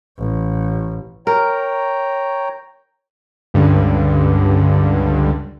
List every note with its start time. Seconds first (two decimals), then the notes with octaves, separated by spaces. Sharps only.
0.18 A1
1.27 A#4 C#5 G5 A#5
3.54 C#2 G2 D3